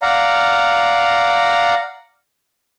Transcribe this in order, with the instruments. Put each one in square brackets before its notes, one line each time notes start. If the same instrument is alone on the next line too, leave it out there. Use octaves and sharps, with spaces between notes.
[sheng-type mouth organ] D5 F5 F#5 A#5